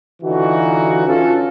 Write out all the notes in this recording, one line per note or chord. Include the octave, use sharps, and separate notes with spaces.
D3 E3 D#4 F4 F#4
C#4 F4 A4